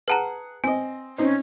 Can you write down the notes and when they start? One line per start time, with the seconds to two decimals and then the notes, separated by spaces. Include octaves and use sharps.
0.08 G#4 B4 F#5 A5 A#5
0.64 C4 D#5 G#5
1.18 C4 C#4 D#4 C5